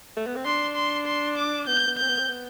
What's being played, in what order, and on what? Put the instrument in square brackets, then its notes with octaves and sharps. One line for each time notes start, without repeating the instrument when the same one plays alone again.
[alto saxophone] A3
B3
C4
[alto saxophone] D4 [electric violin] C6
[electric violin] C6
C6
D6
[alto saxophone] B3 [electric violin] G6
[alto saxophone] B3
[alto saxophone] C4 [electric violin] G6
[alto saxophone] B3
C4
B3